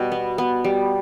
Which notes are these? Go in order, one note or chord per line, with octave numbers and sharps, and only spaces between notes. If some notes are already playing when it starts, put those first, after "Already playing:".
Already playing: B2 G3
B3
B3
G3